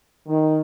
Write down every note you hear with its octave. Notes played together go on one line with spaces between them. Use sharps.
D#3